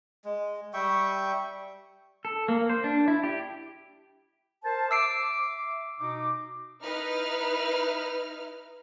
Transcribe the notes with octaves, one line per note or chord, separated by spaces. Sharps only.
G#3
G3 E5 G5 C#6
A4
A#3
C5
D4
E4
G4
A#4 C5 A5
E5 D6 E6 C7 D7
B2 D#4 D6
D#4 E4 B4 F6